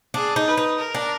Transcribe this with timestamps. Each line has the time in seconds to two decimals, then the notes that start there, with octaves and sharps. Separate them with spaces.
0.14 D4 G#4
0.36 D#4
0.47 B4
0.57 D#4
0.79 A#4
0.95 D4